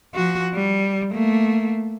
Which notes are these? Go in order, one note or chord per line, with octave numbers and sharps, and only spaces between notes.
F3 F#4
G3
A3 A#3